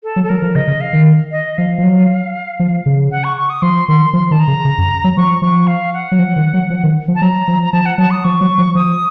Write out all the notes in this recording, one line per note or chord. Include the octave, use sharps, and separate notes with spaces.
A4
F#3
A4
F#3 A#4
F3
C#3 D#5
C#3
F5
D#3
D#5
F3 F5
F3
F#3
F3
C#3
F#5
C#6
C#6
D#6
F3 C6
D#3 C6
F3 C6
D#3 A5
A#5
C#3
C#3
F#2
F#3
F3 C#6
F3 C#6
F5
F#5
F#3
F3
D#3
F#3
F3
D#3
F3
A5
F#3 A#5
F3
A#5
F3 A5
F#5
F#3 A5
D#6
F3 C#6
F#3
F3
F3 D#6